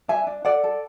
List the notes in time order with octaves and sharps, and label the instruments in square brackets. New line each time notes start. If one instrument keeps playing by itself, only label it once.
[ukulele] D4 E5 G#5
D4
A4 D5 F#5
A4